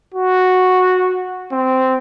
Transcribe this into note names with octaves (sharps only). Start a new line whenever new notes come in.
F#4
C4